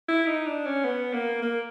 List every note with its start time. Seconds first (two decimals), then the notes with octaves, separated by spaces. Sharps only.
0.08 E4
0.27 D#4
0.46 D4
0.66 C#4
0.84 B3
1.13 A#3
1.42 A#3